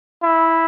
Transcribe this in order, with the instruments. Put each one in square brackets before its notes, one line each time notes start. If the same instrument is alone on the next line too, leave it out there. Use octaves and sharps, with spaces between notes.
[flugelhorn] E4